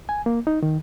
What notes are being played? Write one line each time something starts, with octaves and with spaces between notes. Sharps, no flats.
G#5
A#3
D#4
D#3